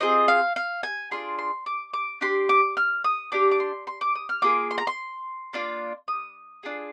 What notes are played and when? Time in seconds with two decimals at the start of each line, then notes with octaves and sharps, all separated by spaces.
0.01 C4 F4 G#4 D#5
0.28 F5
0.56 F5
0.83 G#5
1.11 D4 F4 G#4 C6
1.39 C6
1.66 D6
1.93 D6
2.21 D4 G4 C6
2.49 D6
2.77 F6
3.04 D#6
3.32 D4 G4 D6
3.51 D6
3.60 C6
3.87 C6
4.01 D6
4.15 D#6
4.29 F6
4.42 A#3 F4 G#4 D6
4.71 C6
4.78 A#5
4.87 C6
5.53 A#3 D4 F4
6.08 D#6
6.63 D4 F4 G#4